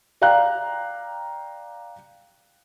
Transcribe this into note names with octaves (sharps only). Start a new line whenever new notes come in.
D5 F5 G5 A#5 F#6